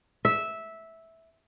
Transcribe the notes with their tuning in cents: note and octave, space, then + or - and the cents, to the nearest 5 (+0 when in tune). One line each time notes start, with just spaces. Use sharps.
E5 -10